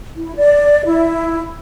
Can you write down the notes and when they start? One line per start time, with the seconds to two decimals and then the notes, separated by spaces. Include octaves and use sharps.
0.16 E4
0.36 D5
0.85 E4